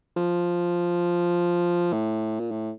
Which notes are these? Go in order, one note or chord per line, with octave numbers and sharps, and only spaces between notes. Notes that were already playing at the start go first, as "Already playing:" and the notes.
F3
A2
A#2
A2